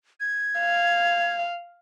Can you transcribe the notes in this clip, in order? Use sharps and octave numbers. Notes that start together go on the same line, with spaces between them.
G#6
F5